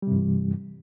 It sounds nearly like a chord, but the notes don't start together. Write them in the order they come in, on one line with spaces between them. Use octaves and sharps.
G3 C3 G2 E3